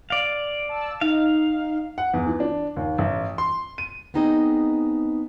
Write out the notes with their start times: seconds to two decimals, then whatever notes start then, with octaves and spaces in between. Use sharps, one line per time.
0.10 D5 F5
0.69 A5 E6
1.01 D#4 F5
1.98 F#5
2.14 E2
2.27 E3
2.40 D4
2.77 D#2
2.98 A1
3.38 C6
3.78 D#7
4.14 B3 C4 D#4 G#4 D#5